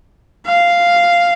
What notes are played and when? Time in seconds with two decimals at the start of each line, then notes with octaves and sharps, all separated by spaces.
0.46 F5